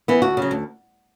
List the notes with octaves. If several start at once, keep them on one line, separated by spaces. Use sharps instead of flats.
E3 B3
D2 F#4
C#3 F#3
D2